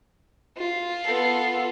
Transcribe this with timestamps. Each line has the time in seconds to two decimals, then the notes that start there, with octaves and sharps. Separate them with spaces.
0.58 F4
1.04 B3 A4